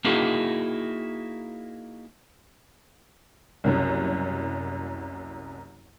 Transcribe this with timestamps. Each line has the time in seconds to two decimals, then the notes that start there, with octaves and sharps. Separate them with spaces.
0.04 A#3 D#4 E4 F#4 G#4
3.64 F#1 C2 F#2